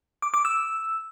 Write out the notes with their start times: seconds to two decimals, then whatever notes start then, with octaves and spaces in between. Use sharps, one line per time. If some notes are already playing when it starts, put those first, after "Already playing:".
0.22 D6
0.34 D6
0.45 E6